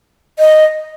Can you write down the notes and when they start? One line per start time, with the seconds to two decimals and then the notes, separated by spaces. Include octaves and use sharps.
0.39 D#5